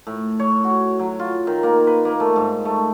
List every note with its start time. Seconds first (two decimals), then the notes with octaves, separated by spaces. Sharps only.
0.07 A2
0.40 C#5
0.64 F#4
0.99 F#3
1.19 F4
1.47 D#3
1.63 A#3
1.87 B4
2.05 A#3
2.20 A3
2.36 G#2
2.65 A3